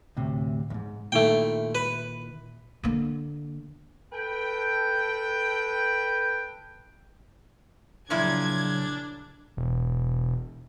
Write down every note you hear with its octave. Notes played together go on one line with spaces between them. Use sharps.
D2 A2 C3
D#2 G#2
A#2 D#3 A3 E4 G5
B4
D3 A#3
A4 B4 G5
A#2 C#3 F3 F#3 D4 E4 G#6
E1